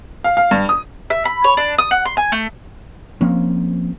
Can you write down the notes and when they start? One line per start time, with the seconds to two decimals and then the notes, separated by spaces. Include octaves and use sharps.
0.24 F5
0.37 F5
0.51 G2
0.69 D#6
1.10 E5
1.25 B5
1.44 C#5
1.57 D4
1.78 D#6
1.91 F#5
2.05 C6
2.17 G#5
2.32 A3
3.21 F3 A#3 C4 C#4